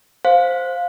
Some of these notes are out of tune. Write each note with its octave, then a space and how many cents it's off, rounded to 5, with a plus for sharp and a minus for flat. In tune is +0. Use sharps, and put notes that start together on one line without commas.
C5 +0 F5 +15